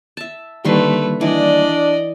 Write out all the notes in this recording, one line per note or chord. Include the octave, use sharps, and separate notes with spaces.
E5 A5
D3 D#3 G3 A3 A#3 B4 C6 C#6
E3 D4 D5 D#5